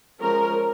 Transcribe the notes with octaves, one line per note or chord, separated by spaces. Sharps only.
F3 G#3 C#4 A#4